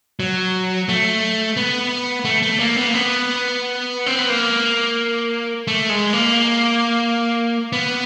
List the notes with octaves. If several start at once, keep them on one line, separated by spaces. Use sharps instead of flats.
F#3
A3
B3
A3
A3
A#3
B3
A#3
B3
C4
B3
A#3
A3
G#3
A#3
B3